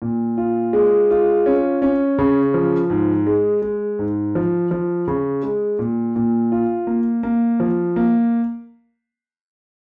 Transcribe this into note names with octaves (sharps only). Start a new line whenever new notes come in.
A#2
F4
G#3
F4
C#4
C#4
C#3
F3
G#2
G#3
G#3
G#2
F3
F3
C#3
G#3
A#2
A#2
F4
A#3
A#3
F3
A#3